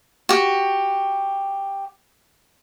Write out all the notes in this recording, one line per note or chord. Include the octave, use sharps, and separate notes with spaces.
F#4 G4